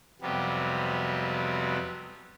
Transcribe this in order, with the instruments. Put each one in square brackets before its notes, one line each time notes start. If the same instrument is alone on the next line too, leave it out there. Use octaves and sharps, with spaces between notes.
[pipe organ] F2 C3 F#3 G3 B3